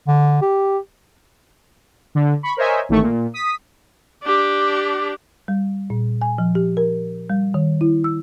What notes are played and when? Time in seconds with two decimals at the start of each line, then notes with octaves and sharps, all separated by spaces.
0.07 D3
0.42 G4
2.15 D3
2.43 B5 C#6
2.57 A#4 C5 C#5 D#5 E5 G#5
2.89 A1 D#3 A3 C#6
3.02 A#2
3.34 D#6 B6
4.24 D4 G4
5.48 G3
5.90 A#2
6.21 G#5
6.38 F3
6.55 G4
6.77 A#4
7.30 G3
7.54 D#3
7.81 E4
8.04 E6